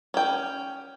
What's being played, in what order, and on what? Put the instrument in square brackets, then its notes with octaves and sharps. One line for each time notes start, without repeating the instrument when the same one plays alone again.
[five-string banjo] C#4 G5